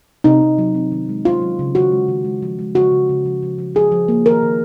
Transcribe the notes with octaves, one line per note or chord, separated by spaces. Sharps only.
C3 D#4
C3
F#3
C4
D#3
G#3
C#4 F4
F#3
C#3
D#3 F#4
G#3
D#3
G#3
F3
G#3
C#3 F#4
C#3
C#3
F3
F3
F3
F3 G#4
F3
A#3
D#3 A#4
D#3